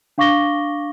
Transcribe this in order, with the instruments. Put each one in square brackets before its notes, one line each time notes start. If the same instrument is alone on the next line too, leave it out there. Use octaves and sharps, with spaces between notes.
[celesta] D4 F5 C#6 D6 A#6 G7